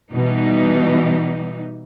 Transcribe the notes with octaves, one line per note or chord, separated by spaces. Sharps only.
B2 E3 G3 D#4